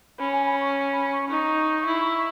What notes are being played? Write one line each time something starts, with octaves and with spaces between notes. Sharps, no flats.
C#4 B5
G#5
B5
C#6
B5
C#6
D#4 C#6
E4